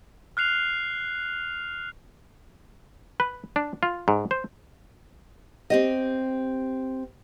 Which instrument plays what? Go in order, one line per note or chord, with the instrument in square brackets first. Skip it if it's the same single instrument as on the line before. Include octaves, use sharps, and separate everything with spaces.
[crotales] F6 F#6 C7 F7
[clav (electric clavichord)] B4
D4
F4
G#2
C5
[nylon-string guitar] C4 G4 D#5